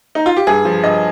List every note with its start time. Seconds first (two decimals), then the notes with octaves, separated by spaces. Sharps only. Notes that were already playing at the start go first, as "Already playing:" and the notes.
0.15 D#4
0.26 F4
0.37 G4
0.47 G2 G#4
0.65 F3
0.83 G2 D#5